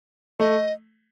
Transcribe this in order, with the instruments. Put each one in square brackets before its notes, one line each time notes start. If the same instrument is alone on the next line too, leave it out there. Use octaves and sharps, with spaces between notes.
[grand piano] A3 [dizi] D#5